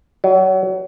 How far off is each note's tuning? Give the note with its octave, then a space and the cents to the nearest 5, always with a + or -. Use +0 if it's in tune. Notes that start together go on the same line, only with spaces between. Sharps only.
F#3 +25